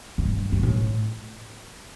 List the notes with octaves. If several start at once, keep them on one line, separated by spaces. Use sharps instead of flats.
G2
G2
A2